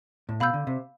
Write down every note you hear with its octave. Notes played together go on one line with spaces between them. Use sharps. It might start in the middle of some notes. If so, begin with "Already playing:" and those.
A2
B2 F5 B5 E6 G6
D3
C3